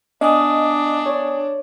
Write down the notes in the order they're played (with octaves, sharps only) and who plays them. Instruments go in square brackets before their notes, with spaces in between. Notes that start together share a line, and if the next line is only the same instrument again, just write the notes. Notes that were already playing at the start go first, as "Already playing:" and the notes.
[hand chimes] B3 G#5 D#6 [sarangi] D4 [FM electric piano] D#5
[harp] C#5 D5